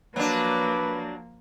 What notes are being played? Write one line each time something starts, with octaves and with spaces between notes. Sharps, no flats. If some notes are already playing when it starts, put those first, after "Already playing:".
F3 F#3 A#3 D4 B4